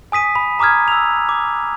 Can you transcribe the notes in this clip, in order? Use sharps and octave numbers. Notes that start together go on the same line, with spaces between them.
G#5 D#6 B6 D#7
B5
A#5 D6 D#6 F6 G#6
E6 F7
D6